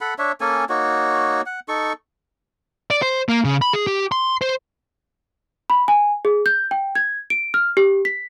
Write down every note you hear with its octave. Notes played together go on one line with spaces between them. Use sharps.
A4 F#5 B5
D4 C#5 E5
A#3 C#4 A4 G#5
A#3 D#4 F#4 C#5
F#5
D#4 A4 C#6
D5
C5
A#3
C#3
B5
G#4
G4
C6
C5
B5
G#5
G#4
G6
G5
G#6
D7
F6
G4
B6